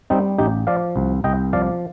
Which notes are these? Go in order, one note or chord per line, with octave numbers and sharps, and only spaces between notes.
G3 C4 D#4
A1 D#4 G4
F3 D5 F5
C2
C2 D#5 G5
F3 D5 F5